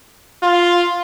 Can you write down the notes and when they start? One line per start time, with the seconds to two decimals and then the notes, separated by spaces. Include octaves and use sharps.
0.43 F4